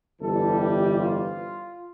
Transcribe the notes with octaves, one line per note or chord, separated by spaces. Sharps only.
G1 F2 E3 G3 A4
G4
F4